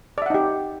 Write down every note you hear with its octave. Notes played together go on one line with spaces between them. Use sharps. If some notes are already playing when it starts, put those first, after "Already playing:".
D#4 G4 D5 E5 F#5